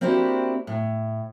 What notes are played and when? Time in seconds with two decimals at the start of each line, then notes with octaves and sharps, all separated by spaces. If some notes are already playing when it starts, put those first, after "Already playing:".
0.01 A#3 C4 D4 E4 F#4 G4
0.67 A2